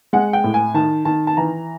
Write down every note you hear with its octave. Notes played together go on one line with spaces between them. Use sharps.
G#3 F#5
G5
A2
G#5
D#3 A5
D#3 A5
A5
E3 A#5